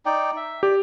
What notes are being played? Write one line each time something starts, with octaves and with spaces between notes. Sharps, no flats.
D#4 D5 G5
E5
G4 D5